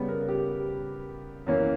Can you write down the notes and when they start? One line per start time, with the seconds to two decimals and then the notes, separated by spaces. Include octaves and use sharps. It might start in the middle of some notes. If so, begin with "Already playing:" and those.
Already playing: C#3 G3 B3 B4
0.09 A#4
0.28 G4
1.46 F#2 E3 A#3 C#4